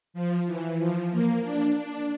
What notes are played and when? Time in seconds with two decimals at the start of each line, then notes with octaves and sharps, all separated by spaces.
0.14 F3
0.46 E3
0.79 F3
1.11 A#3
1.44 D4
1.77 D4